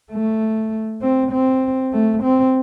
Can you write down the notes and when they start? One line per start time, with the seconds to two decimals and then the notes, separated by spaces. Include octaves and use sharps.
0.12 A3
1.02 C4
1.32 C4
1.93 A3
2.23 C4